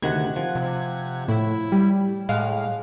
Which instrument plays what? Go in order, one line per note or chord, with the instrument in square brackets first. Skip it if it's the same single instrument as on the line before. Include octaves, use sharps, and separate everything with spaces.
[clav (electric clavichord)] D2 C3 D#3 [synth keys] F#5 G#6
[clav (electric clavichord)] F3
[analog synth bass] C3
[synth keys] A2 [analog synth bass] E4
[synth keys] G3
[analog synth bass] A2 [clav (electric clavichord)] G#3 F#5 [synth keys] F5